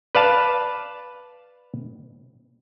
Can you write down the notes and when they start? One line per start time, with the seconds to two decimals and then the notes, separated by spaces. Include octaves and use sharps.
0.15 B4 D5 F5 A5